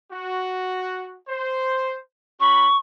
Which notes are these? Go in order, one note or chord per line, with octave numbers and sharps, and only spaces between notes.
F#4
C5
C#4 F#4 B5 C#6